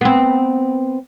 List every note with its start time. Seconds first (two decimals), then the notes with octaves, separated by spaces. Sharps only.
0.01 B3 C4